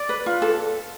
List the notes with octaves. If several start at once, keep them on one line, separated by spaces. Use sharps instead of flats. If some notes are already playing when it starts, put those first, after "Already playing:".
Already playing: D5
B4
F4
A4